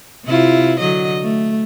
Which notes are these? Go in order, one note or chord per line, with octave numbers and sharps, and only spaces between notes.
C3 E4 F4
D3 F#3 D#5
A3